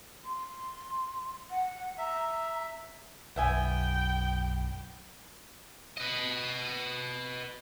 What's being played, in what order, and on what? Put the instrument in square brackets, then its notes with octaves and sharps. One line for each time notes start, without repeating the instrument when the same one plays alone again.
[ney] C6
F#5
[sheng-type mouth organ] E5 [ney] A#5
[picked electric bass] B1 F#2 [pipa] B3 E5 G#5 [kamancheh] G5
[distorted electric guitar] B4 D#5